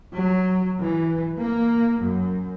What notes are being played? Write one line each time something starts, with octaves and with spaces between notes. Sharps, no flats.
F#3
E3
A#3
F#2